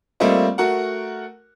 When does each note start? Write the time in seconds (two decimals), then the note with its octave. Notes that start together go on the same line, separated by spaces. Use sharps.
0.20 G3 A3 A#3 C4 F4 D#5
0.58 A3 F#4 A#4 F#5